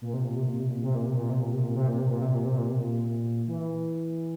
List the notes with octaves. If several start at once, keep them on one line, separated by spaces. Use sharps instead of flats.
A#2
C3
A#2
C3
A#2
C3
A#2
C3
A#2
C3
A#2
C3
A#2
C3
A#2
C3
A#2
C3
A#2
C3
A#2
C3
A#2
C3
A#2
E3